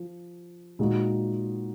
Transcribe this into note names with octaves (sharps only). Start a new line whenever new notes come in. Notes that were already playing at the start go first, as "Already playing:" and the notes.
Already playing: F3
A#2 G#3 D#4 F#4